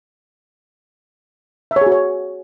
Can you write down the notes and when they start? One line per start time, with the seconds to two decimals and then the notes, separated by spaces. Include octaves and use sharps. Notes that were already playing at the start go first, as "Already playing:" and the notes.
1.71 E5
1.76 C#5
1.81 G#4
1.87 F#4
1.92 C#5